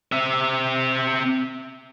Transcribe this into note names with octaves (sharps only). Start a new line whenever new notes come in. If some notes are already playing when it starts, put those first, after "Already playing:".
C4 E5